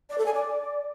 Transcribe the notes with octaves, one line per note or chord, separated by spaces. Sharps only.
D5
A4
G#5
D5